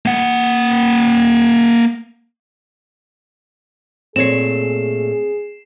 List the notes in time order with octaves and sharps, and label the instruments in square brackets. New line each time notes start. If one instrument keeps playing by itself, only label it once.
[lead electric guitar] A#3 F#5
[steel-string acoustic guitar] A#2 A3 [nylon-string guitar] C4 C#5 [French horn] G#4 [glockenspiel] C7 E7